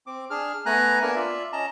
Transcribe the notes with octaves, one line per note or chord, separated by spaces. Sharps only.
C4 D6
D4 G#4 F6
A3 B3 G#5 A#5 F#6
A#3 B3 D4 A#4 G#5
F4 D5 E5
C#4 D#5 A5 A#5